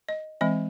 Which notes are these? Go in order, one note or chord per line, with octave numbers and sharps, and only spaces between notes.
D#5
E3 G#3 C4 D#5